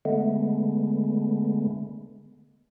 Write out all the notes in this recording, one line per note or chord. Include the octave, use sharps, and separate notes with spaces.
D3 G#3 A3 B3